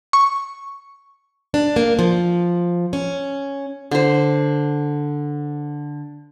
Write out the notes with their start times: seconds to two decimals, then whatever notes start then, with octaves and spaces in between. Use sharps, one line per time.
0.13 C#6
1.54 D4
1.76 A#3
1.99 F3
2.93 C#4
3.91 D3 C5